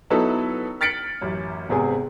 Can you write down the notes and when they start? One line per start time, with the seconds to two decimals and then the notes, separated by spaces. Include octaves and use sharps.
0.10 F#3 B3 D#4 E4 A4 B4
0.81 F6 A6 B6 C#7 D7 F#7
1.22 A1 F#2
1.69 G#1 G#2 C3 B3 G#4 G#5